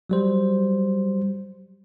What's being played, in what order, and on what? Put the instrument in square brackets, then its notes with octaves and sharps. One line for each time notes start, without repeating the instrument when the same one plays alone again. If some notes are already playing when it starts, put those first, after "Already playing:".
[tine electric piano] F#3 G3 C5